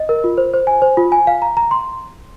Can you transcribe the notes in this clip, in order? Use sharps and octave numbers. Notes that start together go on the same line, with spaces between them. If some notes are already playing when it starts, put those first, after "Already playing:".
Already playing: D#5
A#4
F4
C5
C5
G#5
C5
F4
G#5
F5
A#5
A#5
C6